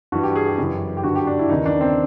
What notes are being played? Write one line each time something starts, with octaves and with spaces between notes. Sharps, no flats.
G2 E3 F#4
G4
G#4
G4
F#2 C#3 E3
G4
G2 D3 F#4
G4
D4
E4
D#2 C#3 E3 D#4
D4
C4